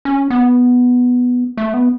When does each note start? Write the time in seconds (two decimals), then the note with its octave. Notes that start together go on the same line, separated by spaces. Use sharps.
0.05 C#4
0.30 B3
1.57 A3
1.74 B3